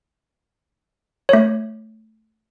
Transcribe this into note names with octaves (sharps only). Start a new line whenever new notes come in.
A3 C#5